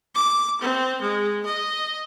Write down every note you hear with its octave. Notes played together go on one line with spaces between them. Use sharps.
D6
C4
G#3
D#5